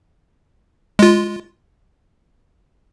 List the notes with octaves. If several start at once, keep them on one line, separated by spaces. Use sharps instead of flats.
G#3 F4